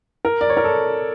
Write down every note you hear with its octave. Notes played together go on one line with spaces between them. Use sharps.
A#4
D5
C#5
A#4
A4